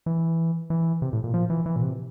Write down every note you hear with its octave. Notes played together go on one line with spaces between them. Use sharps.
E3
E3
C3
A2
A#2
F3
E3
E3
A#2
C3